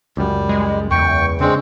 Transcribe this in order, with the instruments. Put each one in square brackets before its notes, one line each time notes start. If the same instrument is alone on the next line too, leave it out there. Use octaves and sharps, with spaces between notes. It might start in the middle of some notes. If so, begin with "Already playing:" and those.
[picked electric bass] C#2 F#2 [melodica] G3
[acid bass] G#3
[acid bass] E2 [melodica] G5 C#6
[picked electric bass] C#3 D4 [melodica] G#3 C4